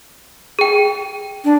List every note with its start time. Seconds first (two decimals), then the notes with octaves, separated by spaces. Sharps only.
0.59 G#4 G5
1.44 D4